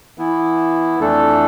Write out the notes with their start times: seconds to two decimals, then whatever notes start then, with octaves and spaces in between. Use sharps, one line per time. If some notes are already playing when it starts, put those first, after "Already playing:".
0.18 E3 B3 E4
0.99 F2 E3 A3 D4 A4